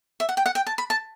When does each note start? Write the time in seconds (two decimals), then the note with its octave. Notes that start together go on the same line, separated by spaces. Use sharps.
0.20 E5
0.29 F#5
0.37 G5
0.46 F#5
0.55 G5
0.67 A5
0.78 B5
0.90 A5